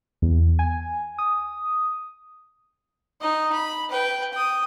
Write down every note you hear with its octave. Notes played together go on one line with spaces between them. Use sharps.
E2
G#5
D#6
D#4 D#5
B5
B4 G5
G5 D#6